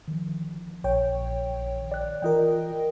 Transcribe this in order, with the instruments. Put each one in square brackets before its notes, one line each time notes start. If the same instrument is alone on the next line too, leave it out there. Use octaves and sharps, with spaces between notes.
[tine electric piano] D#3 F3
[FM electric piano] A#1 C#5 G5
[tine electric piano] D5 F#6
[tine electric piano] E3 F4 [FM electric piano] A#4 D#5 G5